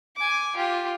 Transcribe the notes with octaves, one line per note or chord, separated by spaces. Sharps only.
G#5 D6
F4 G4